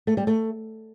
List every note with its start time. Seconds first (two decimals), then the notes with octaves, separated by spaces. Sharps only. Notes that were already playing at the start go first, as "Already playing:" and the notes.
0.07 A3
0.17 G3
0.27 A3